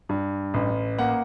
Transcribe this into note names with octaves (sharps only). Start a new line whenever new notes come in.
G2
A1
A#3 F#5